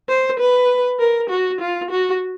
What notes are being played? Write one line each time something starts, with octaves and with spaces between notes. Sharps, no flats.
C5
B4
A#4
F#4
F4
F#4